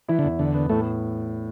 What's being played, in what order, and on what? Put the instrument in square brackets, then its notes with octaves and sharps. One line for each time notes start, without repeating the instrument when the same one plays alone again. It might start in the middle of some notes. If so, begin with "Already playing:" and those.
[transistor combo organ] E3 [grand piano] E4
[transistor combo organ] D3
[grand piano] E2
[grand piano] E2 [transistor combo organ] D3
[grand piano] B3
[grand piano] A2 [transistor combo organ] A3